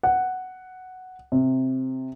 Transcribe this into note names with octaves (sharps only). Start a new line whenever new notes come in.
F#5
C3